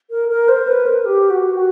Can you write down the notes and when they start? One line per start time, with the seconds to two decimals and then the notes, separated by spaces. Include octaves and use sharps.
0.10 A#4
0.29 A#4
0.48 C5
0.67 B4
0.86 A#4
1.05 G4
1.30 F#4
1.56 F#4